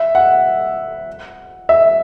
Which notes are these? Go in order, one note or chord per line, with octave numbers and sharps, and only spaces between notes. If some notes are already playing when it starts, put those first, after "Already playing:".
Already playing: E5
F#5
E5